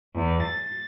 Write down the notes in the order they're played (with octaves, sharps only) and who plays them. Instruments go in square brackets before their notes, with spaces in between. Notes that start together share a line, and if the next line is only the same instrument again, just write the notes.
[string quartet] E2
A6